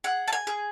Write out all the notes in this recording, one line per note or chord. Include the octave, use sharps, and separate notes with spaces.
G#4 F#5
A5
G#5
G#4